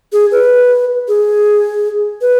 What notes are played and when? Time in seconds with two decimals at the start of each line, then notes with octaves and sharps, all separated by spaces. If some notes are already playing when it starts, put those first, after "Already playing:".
0.13 G#4
0.32 B4
1.08 G#4
2.22 B4